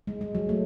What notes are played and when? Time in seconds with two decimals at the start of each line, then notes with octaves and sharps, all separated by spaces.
0.07 G#3
0.21 G#3
0.35 F#3
0.49 A3